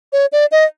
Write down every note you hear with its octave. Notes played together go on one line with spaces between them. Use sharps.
C#5
D5
D#5